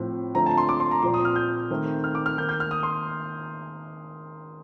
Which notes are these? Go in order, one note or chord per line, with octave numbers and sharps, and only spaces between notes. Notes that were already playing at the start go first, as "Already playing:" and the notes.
Already playing: A2 F3 C4
D3 F3 A3 C4 A#5
A5
C6
D6
C6
A#5
A#2 F3 C4 C6
D#6
F6
G6
D#3 A3 C4
F6
D6
F6
D#3 A#3 G6
G6
F6
D#6
C6